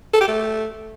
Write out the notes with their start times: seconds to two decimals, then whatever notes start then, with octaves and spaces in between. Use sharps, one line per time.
0.13 A4
0.21 G4
0.28 A3